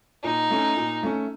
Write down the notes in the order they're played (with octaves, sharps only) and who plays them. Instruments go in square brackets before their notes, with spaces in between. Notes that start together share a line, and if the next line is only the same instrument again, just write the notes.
[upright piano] A#2 [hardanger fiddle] D#4
[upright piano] A3 C#4
A#2
A3 C#4